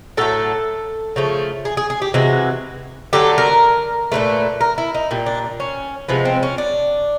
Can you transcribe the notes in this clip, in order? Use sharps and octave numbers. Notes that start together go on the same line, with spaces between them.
A2 F#3 A3 A4
C#3 F3 A3
G#4
G#4
G#4
G4
C3 E3 G#3 F#4
D3 F#3 A3 G4
A#4
A#2 F#3 A3 B4
A#4
E4
D#4
A#2 G3
D4
C#4
C3 F3 G#3 B3
C4
C#4
D4